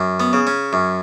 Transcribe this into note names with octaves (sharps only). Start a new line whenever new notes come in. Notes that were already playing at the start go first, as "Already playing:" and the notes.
Already playing: F#2
B3
C#3
C#4
F#2